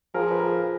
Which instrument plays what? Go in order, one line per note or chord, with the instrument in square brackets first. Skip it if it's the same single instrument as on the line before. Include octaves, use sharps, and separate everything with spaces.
[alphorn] F3 [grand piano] G#4 A#4
[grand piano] B4
G#4 A#4